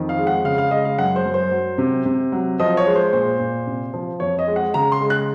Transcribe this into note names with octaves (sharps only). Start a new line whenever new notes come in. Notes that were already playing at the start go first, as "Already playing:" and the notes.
Already playing: F2 D#3
F5
G#3
F#5
C#3 F5
F5
G#3 D#5
F5
F#2 F#5
C5
F#2
C5
F#3
C3
C3
F#3
F3 D#5
C#5
G#3
C5
A#2 C5
A#2
C3
F3
F2 C#5
D#5
G#3
F#5
C#3 A#5
C6
G#3
F#6